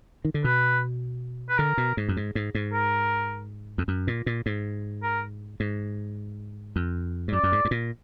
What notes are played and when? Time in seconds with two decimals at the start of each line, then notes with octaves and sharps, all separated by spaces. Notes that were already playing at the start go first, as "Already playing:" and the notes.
0.25 D#3
0.34 D3
0.44 B2 B4
1.49 B4
1.58 D3 A#4
1.78 B2
1.97 G#2
2.09 F#2
2.17 G#2
2.35 G#2
2.55 G#2
2.73 A#4
3.78 F2
3.88 F#2
4.07 A#2
4.26 A#2
4.46 G#2
5.03 A#4
5.60 G#2
6.76 F2
7.28 G#2
7.32 F#2 D5
7.43 F#2
7.52 G#2
7.65 G#2
7.71 A#2